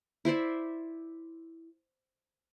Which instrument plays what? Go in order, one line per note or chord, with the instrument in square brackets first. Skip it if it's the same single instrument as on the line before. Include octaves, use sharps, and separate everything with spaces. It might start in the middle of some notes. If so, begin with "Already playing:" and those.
[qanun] E4 C5 D5 E5